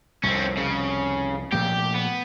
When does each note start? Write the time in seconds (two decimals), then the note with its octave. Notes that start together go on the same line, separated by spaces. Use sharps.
0.23 C2 F2 C4 C#4
0.57 C#3
1.52 A#2 F3 A3 G4
1.94 B3